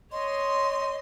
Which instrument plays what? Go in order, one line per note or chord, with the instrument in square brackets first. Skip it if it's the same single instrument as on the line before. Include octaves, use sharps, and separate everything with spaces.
[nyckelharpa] C#5 [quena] D#5 [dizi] C6